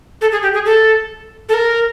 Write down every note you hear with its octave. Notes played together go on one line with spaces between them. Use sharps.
A4
G#4
G4
G#4
A4
A4
A#4